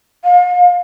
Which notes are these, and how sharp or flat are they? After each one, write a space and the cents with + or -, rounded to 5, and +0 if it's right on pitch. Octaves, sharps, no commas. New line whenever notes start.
F5 +40